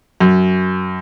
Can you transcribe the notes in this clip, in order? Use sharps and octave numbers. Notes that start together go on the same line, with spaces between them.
F#2